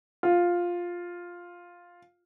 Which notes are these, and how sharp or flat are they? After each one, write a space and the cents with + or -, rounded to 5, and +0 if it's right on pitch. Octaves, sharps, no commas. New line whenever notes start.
F4 +5